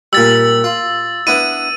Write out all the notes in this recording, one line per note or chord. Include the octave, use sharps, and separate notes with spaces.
A#2 G3 E6 A6
F4
B3 D4 E4 D#7